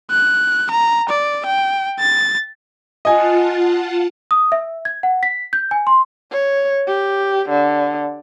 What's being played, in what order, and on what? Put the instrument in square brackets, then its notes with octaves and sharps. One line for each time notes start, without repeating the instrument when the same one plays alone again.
[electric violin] F#6
A#5
D5
G5
A6
[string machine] F4 F#5 A5 [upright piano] D#5 G#5
[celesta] D#6
E5
G#6
F#5
B6
G6
G#5
C6
[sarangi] C#5
G4
D3